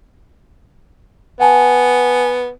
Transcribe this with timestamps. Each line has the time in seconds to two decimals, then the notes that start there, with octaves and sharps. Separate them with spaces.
1.40 B3 F#5 G#5 A5